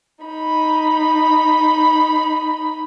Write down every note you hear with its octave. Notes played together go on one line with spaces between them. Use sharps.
D#4 B5